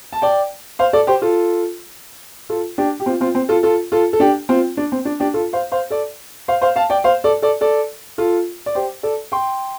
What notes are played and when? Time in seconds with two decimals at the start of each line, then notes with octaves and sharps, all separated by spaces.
0.13 A5
0.22 D5 G5
0.79 C5 F5
0.93 A4 D5
1.07 G4 C5
1.22 F4 A4
2.49 F4 A4
2.78 D4 G4
3.00 G4
3.06 C4 F4
3.21 C4 F4
3.35 C4
3.49 F4 A4
3.63 F4 A4
3.92 F4 A4
4.13 A4
4.20 D4 G4
4.49 C4 F4
4.77 D4
4.92 C4
5.05 D4
5.20 D4 G4
5.34 F4 A4
5.53 C5 F5
5.72 C5 F5
5.90 A4 D5
6.48 C5 F5
6.61 C5 F5
6.76 F5 A5
6.90 D5 G5
7.04 C5 F5
7.24 A4 D5
7.42 A4 D5
7.61 A4 D5
8.18 F4 A4
8.66 D5
8.75 G4 C5
9.03 A4 D5
9.32 G5 C6